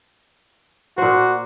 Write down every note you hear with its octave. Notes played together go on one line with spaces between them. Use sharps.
A#2 F#4 C5